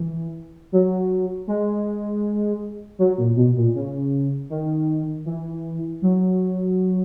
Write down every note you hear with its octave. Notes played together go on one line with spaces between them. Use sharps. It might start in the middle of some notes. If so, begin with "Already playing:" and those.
Already playing: E3
F#3
G#3
F#3
A#2
B2
A#2
C#3
D#3
E3
F#3